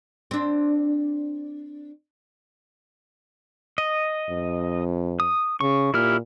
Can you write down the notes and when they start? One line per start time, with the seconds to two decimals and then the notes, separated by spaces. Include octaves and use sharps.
0.31 C4 D4
3.78 D#5
4.30 F2
5.20 D#6
5.61 C#3 C#6
5.94 A#2 E4 G4 F6